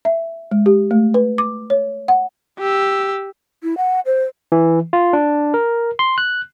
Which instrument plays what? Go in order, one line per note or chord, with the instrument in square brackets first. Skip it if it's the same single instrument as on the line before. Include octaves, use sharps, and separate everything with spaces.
[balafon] E5
G#3
G4
A3
B4
D6
C#5
F#5
[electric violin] G4 E6
[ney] E4
F#5
C5
[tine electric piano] E3
F4
D4
A#4
C6
F#6